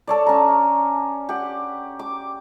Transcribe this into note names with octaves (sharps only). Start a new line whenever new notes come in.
A4 C#5 D5
C#4 A#5
G4 F#5
D6